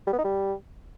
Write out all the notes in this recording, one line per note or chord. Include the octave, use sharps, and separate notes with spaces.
G3
B3
D#4
G3